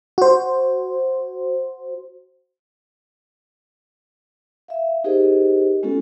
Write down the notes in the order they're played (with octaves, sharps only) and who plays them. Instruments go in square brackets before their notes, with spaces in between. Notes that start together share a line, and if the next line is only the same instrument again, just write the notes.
[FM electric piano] F#4 C5
[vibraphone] E5 F5
D#4 G4 G#4 A#4 C5 D#5
G#3 B3 C#4 F4 F#4 A4